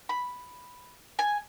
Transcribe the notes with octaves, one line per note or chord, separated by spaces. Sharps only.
B5
G#5